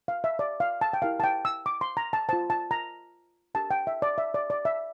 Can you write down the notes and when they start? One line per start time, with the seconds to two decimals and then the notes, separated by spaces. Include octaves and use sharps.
0.08 F5
0.24 E5
0.39 D5
0.60 F5
0.81 A5
0.93 G5
1.02 E4 G4 A#4 F5
1.20 A5
1.24 G5
1.45 E6
1.66 D6
1.81 C6
1.97 A#5
2.13 A5
2.29 F4 C5 A5
2.50 A5
2.71 A#5
3.55 D4 G4 A#4 A5
3.71 G5
3.87 E5
4.02 D5
4.18 E5
4.34 D5
4.50 D5
4.65 E5